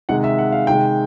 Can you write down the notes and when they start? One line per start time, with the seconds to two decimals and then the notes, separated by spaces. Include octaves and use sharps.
0.09 C3 D#3 G#3 F#5
0.24 E5
0.38 F#5
0.52 F5
0.67 C3 D#3 G#3 G5